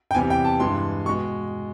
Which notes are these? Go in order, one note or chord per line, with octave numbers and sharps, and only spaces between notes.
G5
E2 C3 E3 G3 G#5
G5
A5
G2 E3 G#3 C6
B2 G#3 C#6